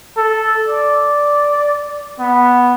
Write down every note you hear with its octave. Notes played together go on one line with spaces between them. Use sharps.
A4
D5
B3